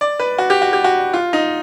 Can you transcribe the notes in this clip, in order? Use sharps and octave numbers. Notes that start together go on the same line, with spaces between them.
D5
B4
F#4
G4
F#4
G4
F#4
F4
D#4